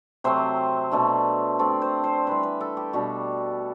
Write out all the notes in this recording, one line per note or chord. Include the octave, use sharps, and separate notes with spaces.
C3 F#3 A3 C4 C5
B2 A3 D4
D3 A3 C4 D5
C5
C5
E3 G3 D4 B4
B4
A4
G4
B2 G3 D4 F#4